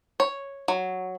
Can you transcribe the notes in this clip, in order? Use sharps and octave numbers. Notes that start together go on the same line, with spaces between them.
C#5
F#3